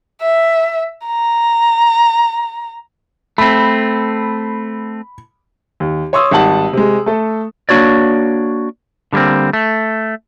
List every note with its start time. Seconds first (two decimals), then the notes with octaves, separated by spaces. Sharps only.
0.22 E5
1.06 A#5
3.38 A3 C4 B5
5.80 D#2
6.13 C#5 C6 C#6 D#6 E6
6.31 G#1 G3 F#5 A5 F#7
6.73 C3 G#3
7.06 A3 A4
7.69 A#3 D4 F#4 C#5 D5
9.13 D3 G3 A3 A#3 C4
9.53 A3